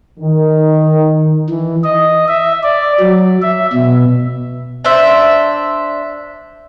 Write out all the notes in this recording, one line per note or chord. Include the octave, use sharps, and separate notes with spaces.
D#3
E3
D#5
E5
D5
F#3
E5
B2
D4 C5 E5